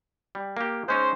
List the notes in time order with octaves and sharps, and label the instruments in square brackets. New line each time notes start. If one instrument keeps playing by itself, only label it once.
[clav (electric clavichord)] G3
A#3 G4
[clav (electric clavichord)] G#3 C#4 D#4 [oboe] C5